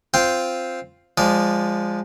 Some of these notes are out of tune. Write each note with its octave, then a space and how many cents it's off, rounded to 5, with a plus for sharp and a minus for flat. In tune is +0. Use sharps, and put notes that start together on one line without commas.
C4 +0 F4 +0 G5 +0
F3 +0 G#3 -20 D5 -20